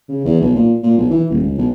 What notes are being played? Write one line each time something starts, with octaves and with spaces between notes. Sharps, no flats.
C#3
E2
B1
A#2
A#2
B1
E3
D#1
C#2
B1